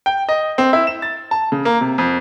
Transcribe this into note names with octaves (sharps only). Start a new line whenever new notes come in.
G5
D#5
C4
E4
E7
A6
A5
C#3
A#3
C3
F2